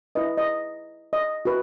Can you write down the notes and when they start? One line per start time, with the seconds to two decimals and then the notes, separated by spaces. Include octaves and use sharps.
0.15 E4 B4 D#5
0.38 D#5
1.13 D#5
1.45 F#4 B4